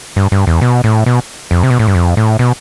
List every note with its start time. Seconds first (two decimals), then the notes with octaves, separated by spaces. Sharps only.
0.16 G2
0.32 G2
0.47 E2
0.61 B2
0.84 A2
1.06 B2
1.51 F2
1.63 C3
1.70 B2
1.79 A2
1.87 G2
1.95 F2
2.17 A2
2.39 B2